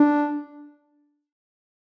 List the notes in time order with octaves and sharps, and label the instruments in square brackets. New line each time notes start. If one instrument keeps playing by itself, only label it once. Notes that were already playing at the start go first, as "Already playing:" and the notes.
Already playing: [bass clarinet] D4